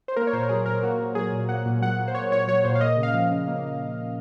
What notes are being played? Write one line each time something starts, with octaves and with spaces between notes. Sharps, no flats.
C5
A#3 A#4
C#5
A#2 C5
A#4
F#3 G#4
A#2 A#4
A#3 F#4
A#2
F#3 G#4
A#2
A#3 F#5
A#2
F#3 F#5
A#2
C5
A#3 C#5
A#2 C#5
F#3 C#5
A#2 C5
F5
A#3 D#5
C#3
F5
F3
C#3
A#3